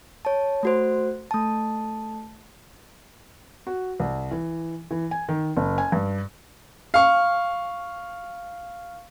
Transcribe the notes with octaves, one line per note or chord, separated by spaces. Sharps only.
C#5 A5
A3 F#4 C5
A3 A5
F#4
C2
E3
E3
G#5
D#3
F#1
G#5
G2
F5 C#6